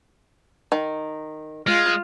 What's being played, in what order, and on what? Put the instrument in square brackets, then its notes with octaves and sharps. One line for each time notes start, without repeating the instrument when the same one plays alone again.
[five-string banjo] D#3
[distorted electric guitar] G#3 [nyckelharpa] F4 [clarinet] F6